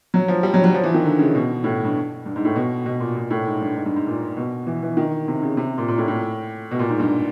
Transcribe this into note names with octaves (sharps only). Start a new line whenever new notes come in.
F#3
F3
G3
F#3
F#3
F3
E3
D#3
D3
C#3
B2
A2
G2
G2
G#2
A2
B2
B2
A#2
A#2
A2
G#2
G2
G#2
G2
G#2
A#2
B2
E3
E3
D#3
C3
C#3
C3
A#2
A#2
A2
A2
B2
A#2
G#2
G2